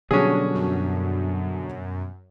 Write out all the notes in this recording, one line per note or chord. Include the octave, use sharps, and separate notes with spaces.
B2 D3 F#3 G3 C#4 D4 F#4 G#4
F#2